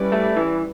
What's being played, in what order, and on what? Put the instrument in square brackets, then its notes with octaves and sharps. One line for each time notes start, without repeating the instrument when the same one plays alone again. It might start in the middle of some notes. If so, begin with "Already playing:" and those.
Already playing: [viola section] G3 C#4 E4 B4 D5
[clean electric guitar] A3
E3